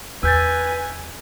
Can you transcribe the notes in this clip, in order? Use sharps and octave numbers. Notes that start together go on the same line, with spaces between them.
E2 B4 G#5 E6 G6 A6